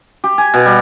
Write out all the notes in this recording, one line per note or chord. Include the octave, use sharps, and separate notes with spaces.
G4
G#5
B2
G3